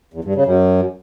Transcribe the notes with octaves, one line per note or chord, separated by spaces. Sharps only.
E2
G2
C#3
F#2